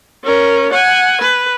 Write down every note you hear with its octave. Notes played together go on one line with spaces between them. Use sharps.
C#4 A#4
F#5 G#5
B4